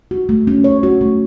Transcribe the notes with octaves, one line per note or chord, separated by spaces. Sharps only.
F#4
A3
C#4
C#5
F#4
A3